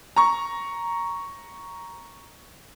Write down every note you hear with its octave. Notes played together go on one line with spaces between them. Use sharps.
A#5 C#6